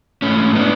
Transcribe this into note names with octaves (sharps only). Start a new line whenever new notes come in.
G#2 A3 C#4
B3 D4